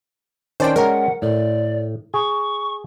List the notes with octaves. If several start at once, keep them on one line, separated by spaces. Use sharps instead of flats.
D#3 C#4 D4 C5 D5 G5
G#3 C#4 A#4 F#5 A#5
A2 D5
G#4 C#6